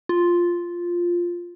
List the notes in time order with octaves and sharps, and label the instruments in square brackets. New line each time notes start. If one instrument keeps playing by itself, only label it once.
[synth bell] F4